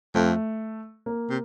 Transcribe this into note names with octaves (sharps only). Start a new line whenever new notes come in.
F2 A3
A#3
C3